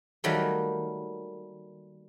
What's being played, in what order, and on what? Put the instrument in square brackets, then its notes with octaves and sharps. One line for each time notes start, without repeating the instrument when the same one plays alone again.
[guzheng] D#3 F#3 G3 A3 A#3